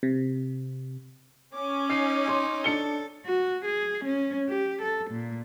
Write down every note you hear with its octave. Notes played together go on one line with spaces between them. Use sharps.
C3
C#4 D6
D#4 C7
C6
D4 A4 C#7 G7
F#4
G#4
C#4
G4
A4
A#2